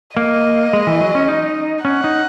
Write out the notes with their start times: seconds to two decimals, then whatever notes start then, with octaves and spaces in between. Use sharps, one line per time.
0.17 A#3 D#5
0.73 G#3
0.87 E3
1.01 F#3
1.15 C#4
1.28 D#4
1.85 C#4 F#5
2.04 D#4